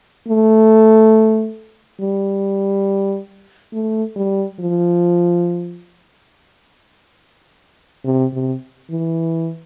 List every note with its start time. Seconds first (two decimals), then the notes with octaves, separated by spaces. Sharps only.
0.29 A3
2.01 G3
3.73 A3
4.16 G3
4.60 F3
8.05 C3
8.33 C3
8.91 E3